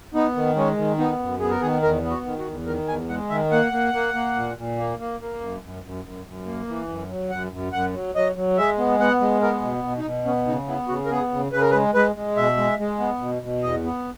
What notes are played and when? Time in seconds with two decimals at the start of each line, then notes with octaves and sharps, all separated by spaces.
0.14 B3 D#4
0.36 D#3
0.56 G#3 C#4
0.77 D#3
0.98 B3 D#4
1.19 F#2
1.40 B3 G#4
1.51 A#4
1.61 D#3 G#4
1.82 E2 A#4
2.03 B3
2.10 F#4
2.25 D#3
2.39 F#4
2.46 E2
2.66 D#3 A#4
2.88 E2 G#5
3.09 G#3 F#5
3.30 D#3 E5
3.51 A#3 F#5
3.72 A#3
3.93 A#3
4.14 A#3
4.36 A#2
4.57 A#2
4.78 A#3
4.99 A#3
5.20 A#3
5.41 F#2
5.63 F#2
5.84 F#2
6.04 F#2
6.26 F#2
6.46 A#3
6.68 E3
6.88 F#2
7.09 F#3
7.30 F#2 F#5
7.52 F#2
7.73 F#2 F#5
7.93 F#3
8.15 F#3 D#5
8.36 F#3
8.57 G#3 E5
8.78 B3
8.99 B3 F#5
9.21 G#3
9.42 B3 A#4
9.62 B2
9.83 B2
9.98 D#4
10.04 B2
10.25 B3 C#4
10.46 C#3 D#4
10.67 B3 E4
10.88 C#3 F#4
11.05 A#4
11.10 B3 G#4
11.31 C#3
11.52 C#3 B4
11.61 A#4
11.71 B4
11.73 G#3
11.94 G#3 B4
12.16 G#3
12.36 B2 E5
12.57 G#3
12.79 G#3
12.99 B3
13.21 B2
13.42 B2
13.62 E2 D#5
13.84 B3